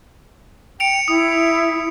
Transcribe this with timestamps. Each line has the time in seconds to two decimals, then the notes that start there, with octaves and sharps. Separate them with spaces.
0.80 G5 C#7 D7 F7
1.08 E4 D#6